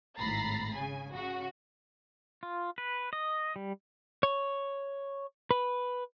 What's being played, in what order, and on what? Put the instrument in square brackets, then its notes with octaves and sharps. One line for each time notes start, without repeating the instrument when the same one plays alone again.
[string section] G#1 A2 A#5 B5 A6 C7
C#3 G#5
C#3 F#4
[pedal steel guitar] F4
B4
D#5
G3
[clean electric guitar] C#5
B4